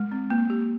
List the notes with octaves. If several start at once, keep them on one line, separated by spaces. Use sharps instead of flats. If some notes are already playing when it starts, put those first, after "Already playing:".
Already playing: G#3
C4
A#3
G4